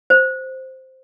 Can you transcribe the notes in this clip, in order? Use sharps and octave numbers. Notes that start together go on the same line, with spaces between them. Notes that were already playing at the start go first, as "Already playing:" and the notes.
C5